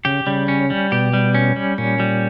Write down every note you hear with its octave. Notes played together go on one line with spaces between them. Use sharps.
C#3 G4
C#3 G3
C#4
G3
B2 G4
G3
C#4
G3
A#2 C#4
G3